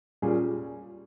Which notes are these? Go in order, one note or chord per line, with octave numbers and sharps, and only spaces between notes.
A#2 G3 C#4 G#4